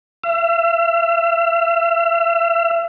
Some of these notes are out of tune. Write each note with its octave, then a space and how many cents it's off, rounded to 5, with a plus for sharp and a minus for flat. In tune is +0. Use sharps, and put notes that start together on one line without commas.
E5 +40